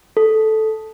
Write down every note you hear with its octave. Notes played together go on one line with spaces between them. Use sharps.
A4